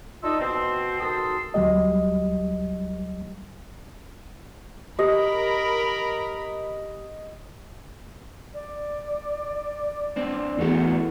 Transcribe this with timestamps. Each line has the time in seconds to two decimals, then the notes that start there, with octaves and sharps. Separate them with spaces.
0.23 D4 D#4 F4 A4 D#5 E5
0.40 B2 C4
1.00 G#2 D#3 F#4 A4 C6 D#6
1.54 D2 F#3 G3 G4 D#5
4.99 G4 A#4 D#5 B5
8.54 D5
10.16 C4 D4
10.59 E2 E3 A3 F#4